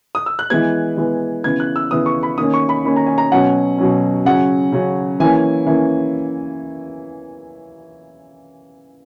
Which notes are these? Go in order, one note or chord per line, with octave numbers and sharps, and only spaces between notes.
D#6
E6
F#6
E3 G#3 B3 G#6
E3 G#3 B3
C#3 E3 B3 G#6
F#6
E6
C#3 E3 B3 D#6
C#6
B5
D#3 A#3 C#4 D#6
C#6
B5
D#3 A#3 C#4 B5
A#5
G#5
A#5
B2 F#3 C#4 F#5
B2 F#3 C#4
C#3 F#3 C#4 F#5
C#3 F#3 C#4
E3 A#3 C#4 G#5
E3 A#3 C#4